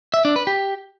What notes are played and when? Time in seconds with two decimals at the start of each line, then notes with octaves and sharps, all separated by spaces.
0.14 E5
0.25 D4
0.36 B4
0.47 G4